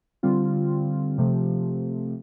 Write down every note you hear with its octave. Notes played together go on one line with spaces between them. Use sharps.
D3 G3 C4 F4
C3 F3 A3